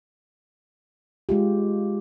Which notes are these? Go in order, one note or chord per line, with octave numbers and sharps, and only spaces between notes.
G#3 F4 G4